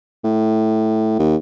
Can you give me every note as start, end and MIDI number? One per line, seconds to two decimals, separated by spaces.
0.24 1.17 45
1.19 1.36 39